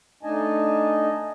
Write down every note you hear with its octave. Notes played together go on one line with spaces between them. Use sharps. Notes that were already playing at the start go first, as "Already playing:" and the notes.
A3 D4 D#4 D#5 G#5 A5